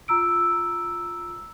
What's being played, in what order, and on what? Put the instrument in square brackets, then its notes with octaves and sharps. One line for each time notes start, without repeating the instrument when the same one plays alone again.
[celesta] F4 A#5 E6 D7